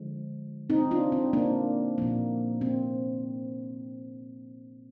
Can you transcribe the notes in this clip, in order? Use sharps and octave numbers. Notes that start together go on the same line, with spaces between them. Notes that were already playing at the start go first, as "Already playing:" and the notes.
Already playing: D3 F3 G#3
C4 D#4
D4 F4
C4
A#3 D4
A#2 F3 A#3
C4